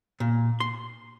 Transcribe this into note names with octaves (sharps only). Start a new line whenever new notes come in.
A#2
C6